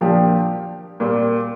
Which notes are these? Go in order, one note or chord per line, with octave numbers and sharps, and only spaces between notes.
A#2 F3 A#3 D4 G4
A#2 G3 A#3